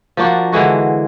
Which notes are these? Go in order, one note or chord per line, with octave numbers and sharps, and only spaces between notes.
F3 A#3 D4 F#4
D3 E3 G#3 F#4